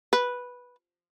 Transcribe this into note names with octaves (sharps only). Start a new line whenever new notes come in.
B4